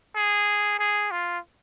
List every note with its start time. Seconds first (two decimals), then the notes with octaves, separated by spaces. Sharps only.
0.15 G#4
0.79 G#4
1.11 F4